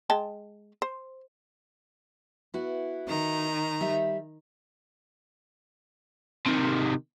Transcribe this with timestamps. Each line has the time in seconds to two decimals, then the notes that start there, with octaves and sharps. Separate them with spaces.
0.10 G#3 G5 A5
0.82 C5
2.54 B3 E4 F#4
3.07 D#3 A#5
3.81 G3 E5
6.46 C3 D#3